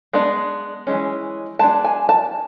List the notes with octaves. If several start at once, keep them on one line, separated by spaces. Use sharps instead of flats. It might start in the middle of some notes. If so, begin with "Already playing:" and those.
G#3 B3 D4
E3 G#3 C#4
G#3 B3 D4 A5
G#5
A5